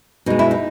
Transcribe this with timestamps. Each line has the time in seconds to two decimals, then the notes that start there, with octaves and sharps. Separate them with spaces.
0.26 B2 G#3 D#4
0.39 E4
0.51 D#4